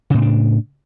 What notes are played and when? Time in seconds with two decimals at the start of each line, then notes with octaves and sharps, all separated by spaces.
0.10 C#3
0.14 A2
0.18 C4
0.22 D4